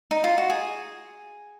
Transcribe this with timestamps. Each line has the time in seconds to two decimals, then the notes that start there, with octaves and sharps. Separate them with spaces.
0.11 D#4
0.24 F4
0.38 F#4
0.50 G#4